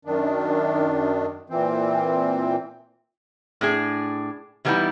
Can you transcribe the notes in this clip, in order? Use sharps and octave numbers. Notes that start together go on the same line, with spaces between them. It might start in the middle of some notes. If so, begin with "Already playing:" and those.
F#2 D#3 D4
A#2 E3 C4
A2 D4 G#4
E3 F#3 G3 B3 D#4 E4